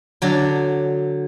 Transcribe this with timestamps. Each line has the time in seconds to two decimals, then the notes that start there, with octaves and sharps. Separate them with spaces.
0.22 D3 F#3